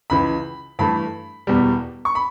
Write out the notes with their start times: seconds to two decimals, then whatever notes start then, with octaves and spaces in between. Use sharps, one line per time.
0.10 C#2 C#3 E3 B5
0.79 G2 E3 A3 B5
1.47 E1 E2 B2 G3
2.05 C#6
2.15 B5